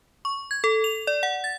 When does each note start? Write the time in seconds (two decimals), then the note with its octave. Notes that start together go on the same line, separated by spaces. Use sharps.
0.25 C#6
0.51 G#6
0.64 A4
0.84 F7
1.07 D5
1.23 F#5
1.44 A6